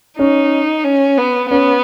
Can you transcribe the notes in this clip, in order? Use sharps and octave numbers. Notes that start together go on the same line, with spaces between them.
C#4 D#4
C#4
B3
B3 C#4